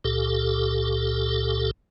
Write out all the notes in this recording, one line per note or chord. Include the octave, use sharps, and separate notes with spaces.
C#2 A#2 G4 A4